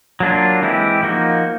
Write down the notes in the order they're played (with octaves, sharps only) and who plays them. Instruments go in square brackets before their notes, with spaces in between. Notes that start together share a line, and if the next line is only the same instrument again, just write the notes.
[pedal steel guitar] F#3 A#3 D4 F4
E3 G#3 C4 E4 G4
F3 A#3 D#4 F#4